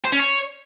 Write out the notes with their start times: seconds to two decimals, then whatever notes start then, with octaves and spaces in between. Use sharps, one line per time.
0.05 C5
0.12 C#4
0.20 C#5